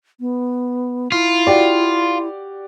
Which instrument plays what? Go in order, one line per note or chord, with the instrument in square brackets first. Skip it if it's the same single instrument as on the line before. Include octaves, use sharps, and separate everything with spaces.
[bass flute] B3
[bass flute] E4 [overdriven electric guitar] F4
[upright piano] F#4 G4 D5